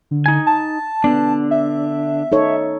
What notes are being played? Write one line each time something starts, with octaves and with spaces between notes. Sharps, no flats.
D3
D#4 G#5
A5
D3 B3 D4
E5
D#4 A4 C#5